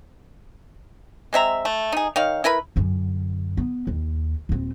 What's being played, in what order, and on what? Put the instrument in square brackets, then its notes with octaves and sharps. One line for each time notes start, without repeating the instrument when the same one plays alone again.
[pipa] G#3 C4 E5 A#5
A3
D#4 G#4
D#3 C#5 F5
E4 A#4 B4 B5
[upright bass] F#2 D3
B3
D#2
D#1 C4